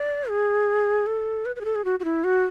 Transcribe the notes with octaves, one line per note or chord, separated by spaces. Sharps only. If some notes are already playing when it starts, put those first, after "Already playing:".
Already playing: D5
G#4
A4
B4
B4
G#4
A4
G#4
F#4
F#4
E4
F#4